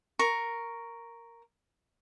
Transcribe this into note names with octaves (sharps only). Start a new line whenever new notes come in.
A#4 C#6